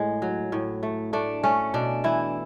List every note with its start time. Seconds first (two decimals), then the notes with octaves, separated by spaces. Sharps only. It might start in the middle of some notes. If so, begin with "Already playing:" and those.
Already playing: A2 G#3
0.22 F#3
0.52 A2
0.83 A3
1.13 A3 D4
1.44 A3 C#4
1.74 B2 D4
2.04 E3 E4